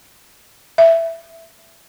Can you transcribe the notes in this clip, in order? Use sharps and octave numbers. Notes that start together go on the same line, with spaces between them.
E5